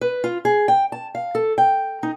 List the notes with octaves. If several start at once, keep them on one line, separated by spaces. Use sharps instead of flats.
B4
F4
G#4
G5
A5
F5
A4
G5
D#4